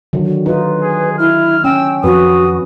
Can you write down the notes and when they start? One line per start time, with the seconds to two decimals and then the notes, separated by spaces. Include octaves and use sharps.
0.13 D3 D#3 F#3
0.46 D#4 F4 B4
0.82 G#4
1.18 E4 F6
1.64 C#4 G5 E6
2.04 F2 F#4 B4 D#6